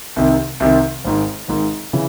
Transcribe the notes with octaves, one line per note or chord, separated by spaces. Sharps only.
C2 C3 D#3
C2 C3 D#3
G#1 G#2 D#3
G#1 G#2 D#3
C#3 E3